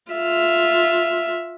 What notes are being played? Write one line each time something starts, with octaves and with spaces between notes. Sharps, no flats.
F4 E5